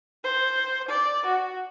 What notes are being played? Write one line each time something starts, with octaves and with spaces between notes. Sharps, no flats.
C5
D5
F#4